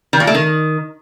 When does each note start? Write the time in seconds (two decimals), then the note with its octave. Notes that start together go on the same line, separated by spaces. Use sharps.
0.13 D#3
0.20 A#2
0.27 A3
0.35 D#3